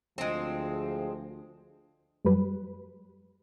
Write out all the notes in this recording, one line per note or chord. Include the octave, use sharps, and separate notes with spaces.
D2 F3 G#3 C4
F#2 F#3 G3 B4